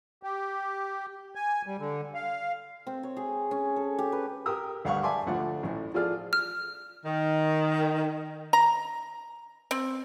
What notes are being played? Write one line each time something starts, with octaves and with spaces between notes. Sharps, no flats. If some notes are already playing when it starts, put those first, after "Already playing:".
G4
G#5
G3
D3
F5
C4
C#5
G#4
C#4
A4
G4
B4
G4 A#4 G5 D#6 E6
D2 G2 F5 F#5 C#6
D5 E5 G#5 A5 C6 D6
D2 D3 F3 A3 F#5
A1 A2
F3 F4 G#4 A4 D5 F6
F6
D#3
A#5
C4